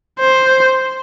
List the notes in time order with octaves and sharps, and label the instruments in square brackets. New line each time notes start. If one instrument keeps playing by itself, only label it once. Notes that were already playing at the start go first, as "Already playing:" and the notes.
[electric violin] C5